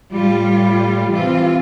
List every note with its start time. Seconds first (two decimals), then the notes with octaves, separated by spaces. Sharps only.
0.12 A2 G3 F4
1.10 C3 E3 C4 F4